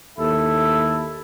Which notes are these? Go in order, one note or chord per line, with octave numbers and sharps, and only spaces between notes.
D#2 E4 A4